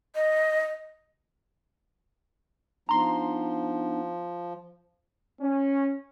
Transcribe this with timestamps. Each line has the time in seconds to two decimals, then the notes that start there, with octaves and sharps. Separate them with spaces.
0.15 D#5
2.89 F3 B3 D4 D#4 A#5 C6
5.41 C#4